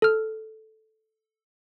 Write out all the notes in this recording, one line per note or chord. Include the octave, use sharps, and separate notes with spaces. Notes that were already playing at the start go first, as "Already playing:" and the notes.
A4 F6